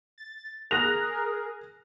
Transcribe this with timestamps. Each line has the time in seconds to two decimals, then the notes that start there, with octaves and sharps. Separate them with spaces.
0.18 A6
0.71 G#4 A#4 F#6 A#6 F7